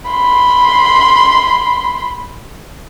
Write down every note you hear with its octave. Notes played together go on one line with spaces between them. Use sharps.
B5 C6